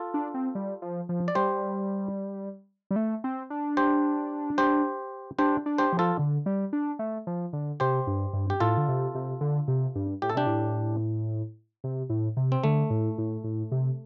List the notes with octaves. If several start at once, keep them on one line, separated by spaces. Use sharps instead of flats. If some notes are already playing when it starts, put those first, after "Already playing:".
Already playing: F4 A4
D4
C4
G3
F3
F3
D5
G3 G4 C5
G3
A3
C4
D4
G4 C5
G4 C5
D4 G4 C5
D4
G4 C5
F3
F4 A4
D3
G3
D4
A3
F3
D3
C3 G4 C5
G2
G2
G4
A2 F4 A4
D3
C3
C3
D3
C3
G2
A2 G4
A4
C3 D4 G4
A2
C3
A2
C3
C4
D3 A3
A2
A2
A2
C3